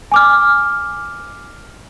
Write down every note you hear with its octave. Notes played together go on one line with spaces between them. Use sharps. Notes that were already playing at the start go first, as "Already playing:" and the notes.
G#5 D6 F6